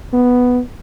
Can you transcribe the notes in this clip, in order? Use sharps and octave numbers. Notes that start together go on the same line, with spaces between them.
B3